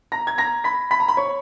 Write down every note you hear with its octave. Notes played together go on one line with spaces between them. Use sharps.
A#5 A#6
G#6
A#5 A#6
B5 B6
B5 B6
A#5
B5
C#5 C#6